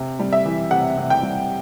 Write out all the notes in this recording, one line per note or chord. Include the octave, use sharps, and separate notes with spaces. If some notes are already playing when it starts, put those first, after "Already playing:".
Already playing: C3
G3
E5
E3
C3 F#5
C3
G5
G3